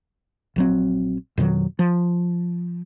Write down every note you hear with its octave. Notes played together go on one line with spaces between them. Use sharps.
A#1 F#3 C4
F2 B2 D#3 F#3
F3